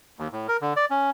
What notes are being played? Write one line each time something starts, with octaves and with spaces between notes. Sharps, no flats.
D#2
A2
A#4
D3
D5
C#4